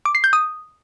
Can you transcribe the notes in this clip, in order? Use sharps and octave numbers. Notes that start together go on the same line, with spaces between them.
D6
C7
G6
D#6